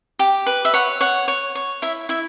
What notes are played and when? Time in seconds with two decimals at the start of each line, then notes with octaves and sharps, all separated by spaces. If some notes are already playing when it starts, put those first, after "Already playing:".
0.19 G4
0.46 B4
0.65 E5
0.73 C#5 F#5
1.01 C#5 F#5
1.28 C#5
1.55 C#5
1.82 E4 E5
2.09 E4 E5